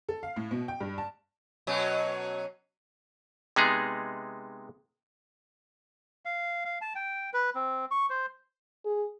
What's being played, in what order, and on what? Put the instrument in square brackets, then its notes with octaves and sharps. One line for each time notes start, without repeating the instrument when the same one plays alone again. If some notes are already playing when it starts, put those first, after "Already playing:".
[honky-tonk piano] A4
F5
A2
B2
G5
G2
A5
[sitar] B2 F#3 C#4
[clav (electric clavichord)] C3 G#3 B3 D#4 G#4
[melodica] F5
F5
A5
G5
B4
C4
C#6
C5
[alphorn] G#4